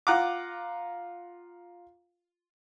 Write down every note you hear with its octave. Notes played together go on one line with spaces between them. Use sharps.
F4 F#5 A#5 D6